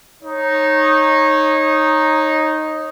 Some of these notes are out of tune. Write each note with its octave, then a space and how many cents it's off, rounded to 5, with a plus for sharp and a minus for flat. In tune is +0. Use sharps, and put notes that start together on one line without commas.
D#4 +0 C#5 -25